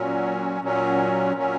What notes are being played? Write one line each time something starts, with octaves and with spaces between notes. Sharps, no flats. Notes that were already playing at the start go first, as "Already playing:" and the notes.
Already playing: A#2 F#3 C#4
A#2 F#3 C#4
A#2 F#3 C#4